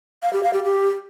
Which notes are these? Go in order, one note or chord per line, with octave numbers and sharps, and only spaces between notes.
F5
G4
F5
G4
G4